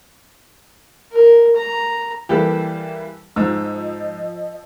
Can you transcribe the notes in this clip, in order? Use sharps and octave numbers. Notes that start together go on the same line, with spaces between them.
A#4
A#5
E3 G3 A#3 G4 A4 B4
G#2 F3 D#5 E6